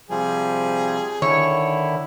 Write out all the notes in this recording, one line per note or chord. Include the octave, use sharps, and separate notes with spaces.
C3 F3 G3 G#4
D3 D#3 E4 C#5